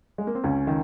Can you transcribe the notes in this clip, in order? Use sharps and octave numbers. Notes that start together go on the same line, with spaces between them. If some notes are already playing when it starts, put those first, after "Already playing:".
G#3
A#3
C4
C#2 C#4
D#3